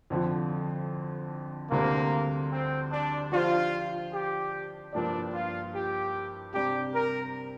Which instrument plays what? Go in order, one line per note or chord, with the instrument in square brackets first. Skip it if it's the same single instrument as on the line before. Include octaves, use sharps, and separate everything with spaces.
[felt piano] F2 D3 F3
[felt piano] D2 D3 G3 C4 [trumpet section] A#3
[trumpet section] C4
D4
[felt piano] F3 D4 G4 C5 [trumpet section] F4
[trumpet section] G4
[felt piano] G2 F3 A#3 G4 D5 [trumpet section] D4
[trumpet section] F4
G4
[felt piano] C3 G3 D4 [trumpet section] G4
[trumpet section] A#4